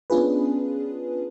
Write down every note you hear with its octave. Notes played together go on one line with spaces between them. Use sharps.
B3 C#4 D4 F4 G#4 B4